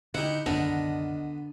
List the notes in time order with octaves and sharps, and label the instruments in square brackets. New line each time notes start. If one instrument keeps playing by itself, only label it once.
[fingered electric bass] D3 [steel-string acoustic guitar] D#4 [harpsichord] E4 G4 [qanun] F#5
[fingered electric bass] C2 F#2 D#3 [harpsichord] D3 B3 [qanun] D4 A#4 [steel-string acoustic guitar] D#5